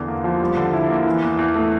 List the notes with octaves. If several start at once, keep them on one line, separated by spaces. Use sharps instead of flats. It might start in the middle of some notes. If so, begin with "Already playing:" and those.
Already playing: E2 D3
A#3
F3
G3
D3
E4
A#3
E3
E2
E2
A3